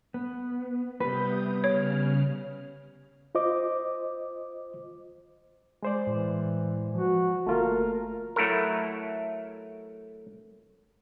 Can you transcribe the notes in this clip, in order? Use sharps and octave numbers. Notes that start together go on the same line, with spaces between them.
B3
C3 G3 B3 B4 D#6 G6
C#3 C#5 F6
F4 C5 D#5 D6
G#3 C5 D5
A2 E3
F3 F#4
F3
G1 A3 A#3 F4 A#4
F#3 A3 E4 A4 A#4